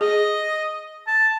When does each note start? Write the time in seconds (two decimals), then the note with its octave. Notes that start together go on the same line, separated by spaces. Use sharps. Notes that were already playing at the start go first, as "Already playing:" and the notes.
0.01 G#4 D#5
1.07 A5